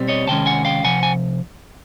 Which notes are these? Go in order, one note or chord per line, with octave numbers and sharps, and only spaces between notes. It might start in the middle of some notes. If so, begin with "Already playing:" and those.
Already playing: B2 G3 C4
C#5 D#5
C2 C3 D#3 G#3 C#4 G5 A5
F#5 G#5
F5 G5
C3 F3 F#5 G#5
G#5